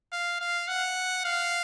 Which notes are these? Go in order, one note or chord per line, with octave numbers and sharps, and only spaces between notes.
F5
F5
F#5
F5